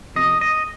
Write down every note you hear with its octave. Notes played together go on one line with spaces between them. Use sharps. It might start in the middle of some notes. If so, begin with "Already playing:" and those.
F2 C3 D#5
D#5